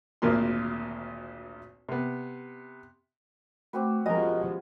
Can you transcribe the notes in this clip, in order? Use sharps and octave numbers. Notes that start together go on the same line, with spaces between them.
G#1 D2 A#2 A#3 A#4 C6
C3 B3
A3 C4 F#4 B4 D6
F3 G#3 B3 C#4 G4 A#4 D#5